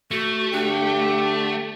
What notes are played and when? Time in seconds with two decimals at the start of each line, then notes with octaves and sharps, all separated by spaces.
0.11 A3 F#4
0.53 D3 D4 G4